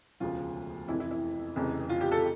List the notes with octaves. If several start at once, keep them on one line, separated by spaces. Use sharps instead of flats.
E1 D2 C#3 F3 F4
F1 F2 E3 E4
E4
E4
F1 F2 C#3 E3
F4
G4
A4